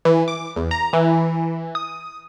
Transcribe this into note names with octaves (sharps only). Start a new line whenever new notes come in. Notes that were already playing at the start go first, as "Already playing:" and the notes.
E3
D6
E2
A#5
E3
D#6